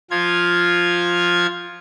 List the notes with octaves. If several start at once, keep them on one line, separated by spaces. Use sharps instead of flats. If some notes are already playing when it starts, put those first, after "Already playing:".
F3 F4 G#6